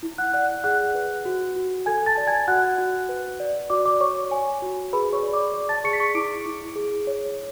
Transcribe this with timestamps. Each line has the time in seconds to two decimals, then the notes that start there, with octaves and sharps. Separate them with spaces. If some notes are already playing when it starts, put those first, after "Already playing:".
0.03 E4
0.18 F#5 F#6
0.33 D5 F#5 F#6
0.64 G#4 F#5 F#6
0.95 B4
1.25 F#4
1.56 F#4
1.86 A4 G#5 G#6
2.06 A5 A6
2.17 D5
2.27 G#5 G#6
2.48 F#4 F#5 F#6
2.78 F#4
3.09 B4
3.40 D5
3.70 F#4 D5 D6
3.86 D5 D6
4.01 C#5 C#6
4.31 C#5 G#5
4.62 F#4
4.93 G#4 B4 B5
5.13 C#5 C#6
5.23 D5
5.33 D5 D6
5.54 D5
5.69 A5 A6
5.84 G#4 C#6 C#7
5.93 B6
6.00 C#6 C#7
6.15 E4 D6 D7
6.46 E4
6.76 G#4
7.07 C#5